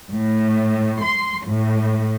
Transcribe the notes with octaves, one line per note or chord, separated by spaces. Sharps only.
A2
C6
A2